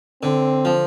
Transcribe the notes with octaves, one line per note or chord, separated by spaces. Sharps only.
D3 C4
F3